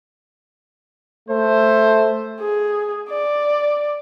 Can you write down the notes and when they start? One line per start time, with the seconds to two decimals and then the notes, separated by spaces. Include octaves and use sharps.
1.29 A3 C5
2.40 G#4
3.09 D5